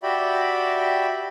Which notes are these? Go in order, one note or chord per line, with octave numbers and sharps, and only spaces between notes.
F#4 G4 D5 E5 G5 B5